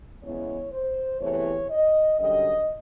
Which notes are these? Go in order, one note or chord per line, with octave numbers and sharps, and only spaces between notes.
E2 C#3 E3 G#3 B3 C#5
C5
E2 C3 E3 A3 C#5
D#5
F#2 D3 G3 D#5